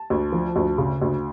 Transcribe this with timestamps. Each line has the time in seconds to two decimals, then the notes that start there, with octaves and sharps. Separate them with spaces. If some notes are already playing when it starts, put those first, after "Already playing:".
Already playing: A5
0.10 D2
0.32 F3
0.56 D2
0.78 C#3
1.02 D2